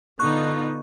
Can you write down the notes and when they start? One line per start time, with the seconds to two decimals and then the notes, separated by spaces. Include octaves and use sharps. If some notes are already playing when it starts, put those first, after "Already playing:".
0.19 D3 B3 D#4 F4 C#6 F#6